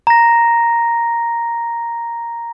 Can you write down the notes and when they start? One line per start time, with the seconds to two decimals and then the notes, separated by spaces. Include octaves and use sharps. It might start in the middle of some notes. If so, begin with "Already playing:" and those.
0.07 A#5 A#6